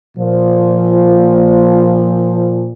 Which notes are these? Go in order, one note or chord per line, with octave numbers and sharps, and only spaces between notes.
A#2 F3